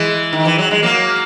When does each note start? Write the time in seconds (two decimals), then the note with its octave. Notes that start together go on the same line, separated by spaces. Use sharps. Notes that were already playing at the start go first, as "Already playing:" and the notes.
Already playing: E3 G#3
0.33 D#3
0.45 E3
0.58 F#3
0.71 G#3
0.83 F#3 A#3